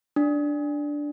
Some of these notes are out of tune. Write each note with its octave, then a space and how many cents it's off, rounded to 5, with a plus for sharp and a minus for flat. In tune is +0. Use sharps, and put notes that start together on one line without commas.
D4 -5